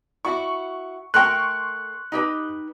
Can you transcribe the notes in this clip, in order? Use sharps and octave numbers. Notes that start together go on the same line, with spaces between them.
E4 F#4 C#6
A3 A#4 G5 C6 C#6 F#6
D#4 G4 B4